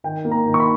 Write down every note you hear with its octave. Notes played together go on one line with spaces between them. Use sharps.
D#3 G5
A#3
A#5
D#3
C#6
B5